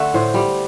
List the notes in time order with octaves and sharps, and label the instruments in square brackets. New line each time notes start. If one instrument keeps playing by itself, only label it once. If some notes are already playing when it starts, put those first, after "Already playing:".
Already playing: [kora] D3 A3 [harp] E5 F#5
[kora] A2 [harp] C5
[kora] G3